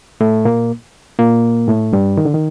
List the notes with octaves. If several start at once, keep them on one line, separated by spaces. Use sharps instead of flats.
A2 A3
A#2 A#3
A#2 A#3
A2 A3
G2 G3
D#3
D3
D#3